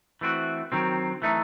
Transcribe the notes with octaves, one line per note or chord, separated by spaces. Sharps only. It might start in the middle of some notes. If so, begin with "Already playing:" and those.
E3 A3 C4 F#4
D#3 F#3 C4
E3 A3 D#4